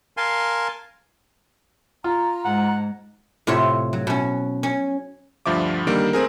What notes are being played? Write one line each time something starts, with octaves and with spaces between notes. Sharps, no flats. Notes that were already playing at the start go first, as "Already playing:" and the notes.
A#4 F5 G#5 A5 C6
F4 A#5
G#2 F#5
A2 C3 F4 C#5 E5
F#3
B2 C#4
C#4
D2 G2 F3 E5 D6
D3 D#3 G3 A#3 D7
A3 C4 G#4 A#4